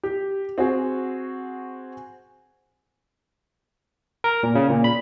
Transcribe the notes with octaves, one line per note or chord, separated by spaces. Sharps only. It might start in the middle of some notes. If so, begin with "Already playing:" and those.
G4
C4 F#4 G#4
A#4
A#2
C#3
A#2
B5